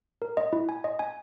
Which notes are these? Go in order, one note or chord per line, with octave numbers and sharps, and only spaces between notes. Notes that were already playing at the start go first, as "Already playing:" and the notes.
A#4
D#5
E4
G#5
D#5
G#5